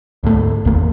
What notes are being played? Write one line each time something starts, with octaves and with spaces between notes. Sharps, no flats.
D2 G#2 A3
G#1 E2 A#3